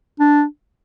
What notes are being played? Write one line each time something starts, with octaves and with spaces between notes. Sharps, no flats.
D4